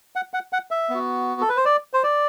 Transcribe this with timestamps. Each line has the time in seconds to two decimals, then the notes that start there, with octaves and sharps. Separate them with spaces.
0.16 F#5
0.34 F#5
0.53 F#5
0.71 E5
0.90 B3 F#4
1.41 A4
1.49 B4
1.57 C5
1.65 D5
1.93 C5
2.04 D5